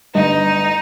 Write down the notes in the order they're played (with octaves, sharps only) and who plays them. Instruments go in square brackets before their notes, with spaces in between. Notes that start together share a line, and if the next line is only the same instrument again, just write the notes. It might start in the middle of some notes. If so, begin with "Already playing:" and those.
[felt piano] G1 B4 D#5 [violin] D#4